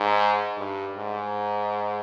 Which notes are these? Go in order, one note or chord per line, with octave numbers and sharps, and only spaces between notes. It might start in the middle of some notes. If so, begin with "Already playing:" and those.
Already playing: G#2
G2
G#2